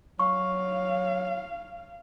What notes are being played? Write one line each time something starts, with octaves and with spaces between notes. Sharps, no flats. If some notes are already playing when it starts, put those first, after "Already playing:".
F#3 F5 C#6